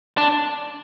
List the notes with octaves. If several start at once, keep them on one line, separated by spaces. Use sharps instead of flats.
D4